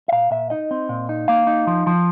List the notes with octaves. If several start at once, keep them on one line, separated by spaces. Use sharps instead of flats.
E5
A#2 F5
A#2 E5
D#4 D#5
C4
A#2
D#4
A#3 F5
D#4
F3
F3